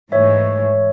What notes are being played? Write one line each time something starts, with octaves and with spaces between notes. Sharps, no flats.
G#2 E3 A3 C#5 E5